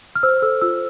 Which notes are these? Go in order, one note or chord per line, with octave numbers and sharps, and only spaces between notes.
F6
C5 E6
A4 E6
F4 E6